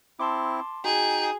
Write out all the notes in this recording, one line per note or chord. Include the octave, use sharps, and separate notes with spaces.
C4 E4 A5 C6 D6
D#4 F#4 G#4 G5